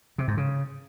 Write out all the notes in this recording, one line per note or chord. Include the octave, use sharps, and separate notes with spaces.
C3
G#2
C#3